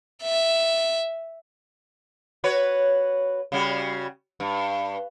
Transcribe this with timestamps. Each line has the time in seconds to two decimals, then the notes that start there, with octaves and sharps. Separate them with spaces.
0.24 E5
2.44 F#4 B4 C#5
3.52 C#3 G3 F#4
4.40 G2